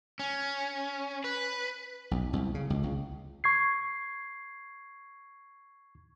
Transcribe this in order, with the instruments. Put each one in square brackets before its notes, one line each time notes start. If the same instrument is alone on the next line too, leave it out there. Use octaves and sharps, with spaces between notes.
[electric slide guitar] C#4
B4
[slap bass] B1
C2
C#3
C#2
C#2
[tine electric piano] C#6 G#6 C7